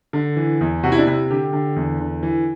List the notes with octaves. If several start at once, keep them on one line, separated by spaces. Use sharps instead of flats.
D3
E3
E2
C3 F#4
E4
D4
C3 E4
D3 G4
D3
E2
D3
E3